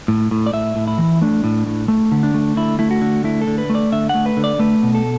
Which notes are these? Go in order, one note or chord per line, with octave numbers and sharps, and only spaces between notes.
A2
A2
D5
A2 E5
A2
E4
E3
A3 D4
A2
A2
A3
D3
D4
A3
D3 E4
A3 E4
F#4
D3
A3 E4
A4
D3
B4
A3
D5
D3 E5
F#5
A3
B4
D3
D5
A3 B4
B2
A4